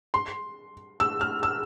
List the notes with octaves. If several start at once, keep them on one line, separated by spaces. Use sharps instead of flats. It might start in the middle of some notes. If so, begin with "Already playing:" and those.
C6
E6
F6
E6